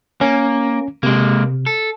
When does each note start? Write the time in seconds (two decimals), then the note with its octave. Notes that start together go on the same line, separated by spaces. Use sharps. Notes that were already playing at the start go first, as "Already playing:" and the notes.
0.21 A#3 C#4
1.03 C3 G#3 A#3
1.66 A4